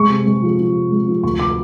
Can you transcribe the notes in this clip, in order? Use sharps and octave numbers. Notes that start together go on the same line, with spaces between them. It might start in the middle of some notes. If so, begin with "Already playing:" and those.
Already playing: G#3 C#6
C3
G#3
F3
F3
C3
G#3
F3
D2 C#6
D6